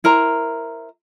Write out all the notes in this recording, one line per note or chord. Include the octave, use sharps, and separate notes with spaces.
E4 A#4 C5 A#5